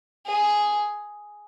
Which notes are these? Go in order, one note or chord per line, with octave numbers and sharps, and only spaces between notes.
G#4